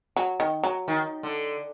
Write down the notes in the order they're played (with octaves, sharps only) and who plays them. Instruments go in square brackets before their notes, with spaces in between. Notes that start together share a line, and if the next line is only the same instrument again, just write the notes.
[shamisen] F#3
D#3
F#3
[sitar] D#3
D3